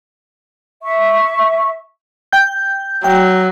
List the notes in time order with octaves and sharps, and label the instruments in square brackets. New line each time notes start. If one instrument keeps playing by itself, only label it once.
[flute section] E5 C#6
[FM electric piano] G5 G6
[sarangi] F#3 [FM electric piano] G5